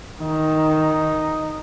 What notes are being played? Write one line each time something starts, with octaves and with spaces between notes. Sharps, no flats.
D#3 D#4